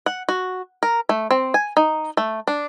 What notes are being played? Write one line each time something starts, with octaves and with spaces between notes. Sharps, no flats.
F#5
F#4
A#4
A3
C4
G#5
D#4
A3
D4